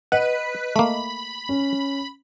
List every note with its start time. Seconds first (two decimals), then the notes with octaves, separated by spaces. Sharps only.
0.12 B4 D#5 F#5
0.76 A3 A#3 B5
1.49 C#4